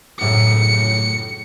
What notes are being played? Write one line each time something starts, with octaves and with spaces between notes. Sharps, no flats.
F#2 A2 C#3 C#7